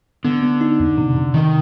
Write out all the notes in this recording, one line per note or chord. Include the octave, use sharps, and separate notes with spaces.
D3 B3
B3
D#4
F2
C3
C3
C3 D#3